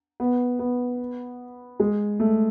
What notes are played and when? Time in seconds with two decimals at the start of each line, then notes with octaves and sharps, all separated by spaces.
0.20 B3
0.59 B3
1.80 G#3
2.20 A3